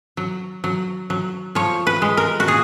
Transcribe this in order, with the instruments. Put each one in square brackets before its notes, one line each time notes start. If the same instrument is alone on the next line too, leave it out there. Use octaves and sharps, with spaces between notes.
[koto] F#3
F#3
F#3
F3 C#5
B4
G#3
A#4
F#4
A#2 G#4